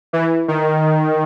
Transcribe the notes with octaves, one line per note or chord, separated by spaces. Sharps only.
E3
D#3